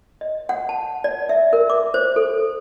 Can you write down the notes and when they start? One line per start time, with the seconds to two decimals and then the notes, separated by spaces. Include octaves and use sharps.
0.21 D#5
0.49 F#5
0.69 A5
1.04 D5
1.29 E5
1.53 A#4
1.70 D6
1.94 C5
2.16 A4